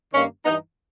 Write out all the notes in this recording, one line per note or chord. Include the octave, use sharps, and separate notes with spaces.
G2 D#3 A#3 C#4
G2 E3 B3 D#4